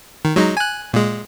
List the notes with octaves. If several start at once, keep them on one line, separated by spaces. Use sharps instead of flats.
D#3
F#3 G#3 D#4
G#5 F#6
A#2 G#3